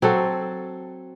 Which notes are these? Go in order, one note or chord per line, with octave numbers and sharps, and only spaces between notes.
F#3 C4 F#4 A4